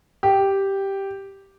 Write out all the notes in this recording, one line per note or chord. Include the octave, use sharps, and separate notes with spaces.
G4